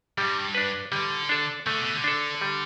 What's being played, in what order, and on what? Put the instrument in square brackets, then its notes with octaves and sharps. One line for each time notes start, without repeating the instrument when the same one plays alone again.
[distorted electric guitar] G2 [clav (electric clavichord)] G3
[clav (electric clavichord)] D4 B4
[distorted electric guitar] D3 [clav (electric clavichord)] G3
[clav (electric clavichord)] D4 A4
[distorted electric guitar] D3 [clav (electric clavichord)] A3
[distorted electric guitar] B2
D3
[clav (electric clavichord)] D4 A4
G3